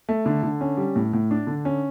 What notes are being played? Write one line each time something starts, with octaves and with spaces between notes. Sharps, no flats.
A3
D3
D3
C#4
G3
A2
A2
D4
D3
C#4